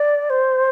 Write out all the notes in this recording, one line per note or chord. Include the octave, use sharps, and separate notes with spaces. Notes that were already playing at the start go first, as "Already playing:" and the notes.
Already playing: D5
C5